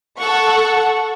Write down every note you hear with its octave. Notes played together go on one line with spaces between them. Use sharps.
A4 F#5 C#6